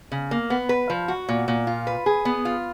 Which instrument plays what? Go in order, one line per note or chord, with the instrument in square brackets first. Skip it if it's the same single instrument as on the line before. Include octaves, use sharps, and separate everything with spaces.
[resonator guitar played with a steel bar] C#3
A#3
B3
B4
F3
F#4
A#2
A#2
F4
B4
G#4
B3
F4